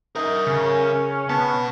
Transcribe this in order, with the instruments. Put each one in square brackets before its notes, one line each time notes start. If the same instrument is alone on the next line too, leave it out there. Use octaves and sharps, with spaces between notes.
[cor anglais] D#4 [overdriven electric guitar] A#4 E5
[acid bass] C#3 [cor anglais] C#4
[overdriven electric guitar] B2 A5 [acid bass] B3